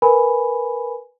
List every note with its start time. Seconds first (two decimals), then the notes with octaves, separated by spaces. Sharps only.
0.02 A#4 B4 G#5 B5